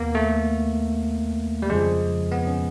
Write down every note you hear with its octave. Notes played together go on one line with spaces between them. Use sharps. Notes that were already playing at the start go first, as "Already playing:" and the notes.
Already playing: D#2 D#3 A#3 B3
A3
G3
F2 C#3 F3 G#3
B3
C#4